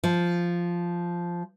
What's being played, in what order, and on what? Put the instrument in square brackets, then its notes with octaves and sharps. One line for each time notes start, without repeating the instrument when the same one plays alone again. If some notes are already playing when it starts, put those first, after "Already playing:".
[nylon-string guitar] F3